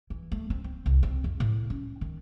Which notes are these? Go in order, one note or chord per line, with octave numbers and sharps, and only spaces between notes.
E3
A3
C4
C4
C2
C4
F2
A2
C#4
D#3